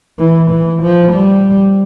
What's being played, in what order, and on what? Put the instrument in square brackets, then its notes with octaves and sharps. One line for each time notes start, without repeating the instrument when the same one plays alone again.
[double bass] E3
E3
F3
G3